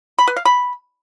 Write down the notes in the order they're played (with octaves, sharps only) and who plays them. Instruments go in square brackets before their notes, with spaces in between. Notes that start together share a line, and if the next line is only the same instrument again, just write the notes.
[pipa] B5
B4
F5
B5